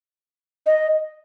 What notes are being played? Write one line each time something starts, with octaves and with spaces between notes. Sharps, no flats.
D#5